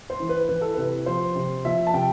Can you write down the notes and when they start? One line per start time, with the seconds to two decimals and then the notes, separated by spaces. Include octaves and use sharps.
0.10 C5
0.20 E3
0.29 B4
0.49 E3 B4
0.61 A4
0.75 C3 B4
1.06 F3 C5
1.35 C3
1.65 F3 E5
1.87 A5
1.93 C3 G5